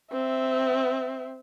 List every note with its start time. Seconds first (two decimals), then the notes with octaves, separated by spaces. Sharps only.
0.12 C4 E5